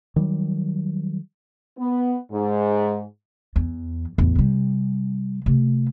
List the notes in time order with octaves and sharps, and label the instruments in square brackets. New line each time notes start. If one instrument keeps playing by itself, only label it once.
[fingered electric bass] D#3 F#3 G3
[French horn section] B3
G#2
[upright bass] E2
A1 E2
C3 G3
C3 A3